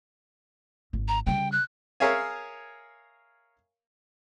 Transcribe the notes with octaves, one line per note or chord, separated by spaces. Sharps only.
G#1
A#5
C#3 G3 G5
F#6
G#4 A#4 C#5 E5 F5 G#5